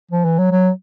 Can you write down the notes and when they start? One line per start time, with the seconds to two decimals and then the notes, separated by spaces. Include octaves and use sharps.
0.11 F3
0.25 E3
0.38 F#3
0.51 F#3